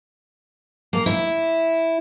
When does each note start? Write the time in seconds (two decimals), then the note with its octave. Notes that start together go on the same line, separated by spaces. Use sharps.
0.93 A#3
1.06 E4